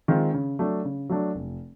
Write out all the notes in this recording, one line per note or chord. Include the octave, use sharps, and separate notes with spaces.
D#3 G#3 C4 F4
C#3
F#3 A3 D4
C#3
F#3 A3 D4
F1